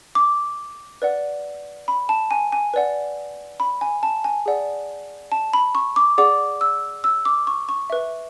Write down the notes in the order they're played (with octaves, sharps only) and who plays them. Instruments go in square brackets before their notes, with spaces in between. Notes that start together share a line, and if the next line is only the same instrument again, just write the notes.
[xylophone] D6
B4 D5 F#5
B5
A5
G#5
G#5
B4 D5 F#5
B5
G#5
A5
G#5
G#4 D5 F#5
A5
B5
C#6
D6
G#4 D5 F#5 D6
E6
E6
D6
C#6
C#6
B4 E5